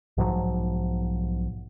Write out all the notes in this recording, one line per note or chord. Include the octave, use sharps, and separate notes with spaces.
B1 G#2 F3 F#3